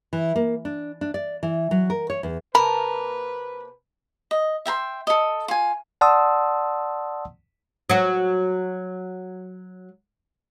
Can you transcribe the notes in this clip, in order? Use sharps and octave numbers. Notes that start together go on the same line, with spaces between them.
E3
A#3
D4
D4
D5
E3
F#3
A#4
C#5
E2
C3 A#3 A#4 B4 A5 B5
D#5
E5 G5 A#5 C6
A4 D#5
F4 G#5
D5 F#5 A5 C6 D#6 E6
F#3 F#4